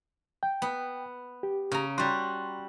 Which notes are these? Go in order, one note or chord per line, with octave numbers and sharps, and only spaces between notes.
G5
B3
G4
C#3 A#5
G3 F#4 C6